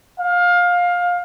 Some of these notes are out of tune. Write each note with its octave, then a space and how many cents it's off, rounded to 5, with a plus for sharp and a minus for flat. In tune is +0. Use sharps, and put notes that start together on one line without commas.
F5 +20